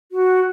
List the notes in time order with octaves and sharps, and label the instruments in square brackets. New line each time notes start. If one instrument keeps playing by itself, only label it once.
[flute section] F#4